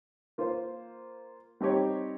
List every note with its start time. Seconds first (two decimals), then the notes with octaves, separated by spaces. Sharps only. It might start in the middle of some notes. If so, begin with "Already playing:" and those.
0.38 A#3 F4 C5
1.61 G3 C4 D#4 G4 C#5